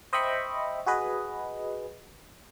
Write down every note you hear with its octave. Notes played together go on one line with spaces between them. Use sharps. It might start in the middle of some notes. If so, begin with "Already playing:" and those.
C5 D#5 E5 G5 B5 C#6
F#4 G#4 B4 D#5